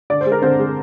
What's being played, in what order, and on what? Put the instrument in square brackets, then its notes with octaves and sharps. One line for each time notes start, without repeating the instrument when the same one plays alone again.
[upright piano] D3 D5
C5
G#3
A#4
D3 C4 C5
G#3